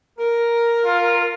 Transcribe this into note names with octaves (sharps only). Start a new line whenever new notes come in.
A#4
F4